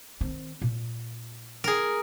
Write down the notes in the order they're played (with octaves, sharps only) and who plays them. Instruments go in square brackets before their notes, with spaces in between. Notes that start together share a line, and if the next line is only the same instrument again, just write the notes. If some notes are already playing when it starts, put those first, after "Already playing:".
[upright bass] D#3 C4
A#2
[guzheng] G#4 A#4